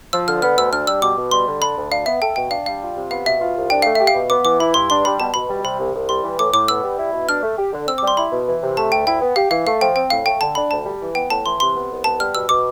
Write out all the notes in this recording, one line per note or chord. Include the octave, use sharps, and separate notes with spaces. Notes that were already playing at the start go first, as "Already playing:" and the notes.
F3 E6
D3 F6
B3 F6
D2 E6
D4 F6
G3 E6
B2 D6
B2
G3 C6
D3
D4 B5
D2
D4 F5
B3 E5
A4 G5
B2 G5
D4 F5
G3 F5
F4
C3
B3 F5
B2 E5
F4
C2
D4 G5
A3 F5
G4 E5
F5
B2
B3 D6
E3 D6
E4 B5
G2 C6
D4 C6
G3 B5
B2 A5
B2 B5
G3
C3 B5
C2
C2
G3 C6
E3
A2 D6
A2 D6
B3 E6
G3
E4
B2
D4 F6
A3
G4
D3
C4 E6
D6
G3
C6
E4 B5
B2
E3
C3
A3 A5
D2 G5
E4 G5
B3
G4 F5
E3 F5
A3 F5
F3 G5
C4 G5
A2 F5
A3 G5
D3 A5
D4 B5
D2 A5
G3
E3
B3 G5
A2 A5
E3 C6
C3 C6
B3
C2
B3 A5
G3 F6
B2 E6
B2 D6